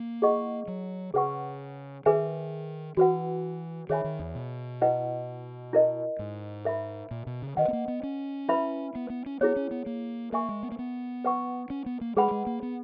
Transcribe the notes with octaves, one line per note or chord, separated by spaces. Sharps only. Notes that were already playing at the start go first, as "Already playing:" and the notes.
Already playing: A#3
E4 G#4 D#5 F#5 C#6
F#3
C#3 G#4 B4 F#5 C#6
D#3 G#4 B4 E5 G#5
E3 F#4 B4 F#5
D#3 G#4 C#5 E5 G#5 B5
D#3
E2
B2
E4 B4 D#5 F#5
E4 A#4 D#5
G#2
A#4 E5 B5
A#2
B2
C#3
D#3 B4 D#5 F#5
B3
A#3
B3
C#4
E4 B4 E5 B5
B3
B3
C#4
B3 E4 G#4 C#5
C#4
B3
A#3
A#3 A#4 E5 G#5 C#6
G#3
B3
A#3
B3
B4 F#5 C#6
C#4
B3
A#3
G#3 G#4 B4 F#5 B5
G#3
A#3
B3